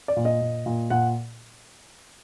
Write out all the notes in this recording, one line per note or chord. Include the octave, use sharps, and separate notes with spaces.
D5
A#2
D#5
A#2
A#2
A#2 F#5